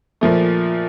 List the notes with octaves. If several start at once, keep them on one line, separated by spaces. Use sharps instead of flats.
A#2 F3 A3